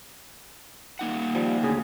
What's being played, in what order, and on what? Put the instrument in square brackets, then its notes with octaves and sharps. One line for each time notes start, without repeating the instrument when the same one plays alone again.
[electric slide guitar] A#3 D#4 F#5
[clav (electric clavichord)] F3 G3
D2 C#3 G#4